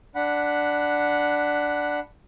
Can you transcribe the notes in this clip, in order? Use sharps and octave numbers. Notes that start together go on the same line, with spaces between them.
D4 F#5 B5